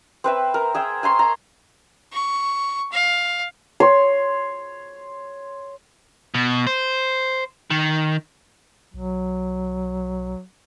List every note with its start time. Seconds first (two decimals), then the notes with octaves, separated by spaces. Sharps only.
0.24 C4 B4 E5
0.54 A#4
0.74 G#4 E5 G5
1.03 G#5 A#5 C6 C#6
1.19 A#5
2.13 C#6
2.92 F5
3.80 C#5 C6
6.34 B2
6.67 C5
7.70 D#3
8.94 B1 F#3